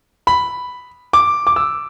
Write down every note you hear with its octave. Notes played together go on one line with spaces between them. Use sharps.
B5
D6
D6
E6